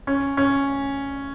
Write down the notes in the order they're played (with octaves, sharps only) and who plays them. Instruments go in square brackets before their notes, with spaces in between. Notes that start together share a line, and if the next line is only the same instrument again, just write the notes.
[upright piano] C#4
C#4